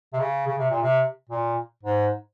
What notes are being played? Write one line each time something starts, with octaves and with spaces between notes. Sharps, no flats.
C3
C#3
C#3
C3
A#2
C3
A#2
G#2